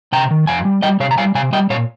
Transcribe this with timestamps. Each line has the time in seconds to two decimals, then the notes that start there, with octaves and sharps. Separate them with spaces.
0.12 C3 G5 A#5
0.31 D#3
0.47 F2 F5 G#5
0.65 G3
0.82 G3 D#5 G5
1.00 C3 C#5 F5
1.11 A#5
1.18 G3 F5 G#5
1.35 C3 F5 G#5
1.53 G3 D#5 G5
1.70 A#2 C#5 F5